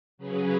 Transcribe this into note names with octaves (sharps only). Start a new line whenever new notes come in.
C#3 F#3 C#4 G#4 B4